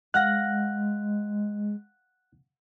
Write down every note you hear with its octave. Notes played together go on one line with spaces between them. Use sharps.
G#3 F5 F#5 F#6 A#6